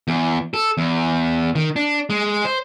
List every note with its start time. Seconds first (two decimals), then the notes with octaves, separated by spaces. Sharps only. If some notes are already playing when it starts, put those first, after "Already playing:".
0.08 E2
0.54 A4
0.78 E2
1.55 D#3
1.76 D4
2.10 G#3
2.45 C5